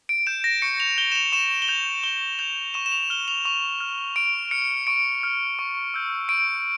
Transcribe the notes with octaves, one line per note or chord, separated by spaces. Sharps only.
D7
G6 E7
A#6
C#6 C#7
F7
G6 G7
E7
F7
C#6 E7
G7
G6 F7
C#6 G7
G6 F7
C#6 E7
E7
F7
F6 G7
F7
C#6 F7
F6
C#6 D7
F6 C#7
C#6 D7
F6
C#6
E6 G6
C#6 D7